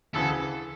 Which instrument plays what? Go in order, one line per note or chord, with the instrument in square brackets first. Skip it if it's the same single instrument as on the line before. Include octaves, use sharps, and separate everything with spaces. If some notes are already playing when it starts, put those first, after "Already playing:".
[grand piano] D2 C#3 E3 [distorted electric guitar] A4